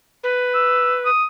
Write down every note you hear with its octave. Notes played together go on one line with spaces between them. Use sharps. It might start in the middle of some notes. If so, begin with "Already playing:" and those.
B4
E6
D#6